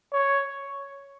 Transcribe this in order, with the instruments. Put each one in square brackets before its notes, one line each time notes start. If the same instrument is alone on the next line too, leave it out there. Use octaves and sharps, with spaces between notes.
[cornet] C#5